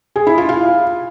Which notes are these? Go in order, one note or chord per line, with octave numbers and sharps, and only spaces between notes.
G#4
E4
F4
F5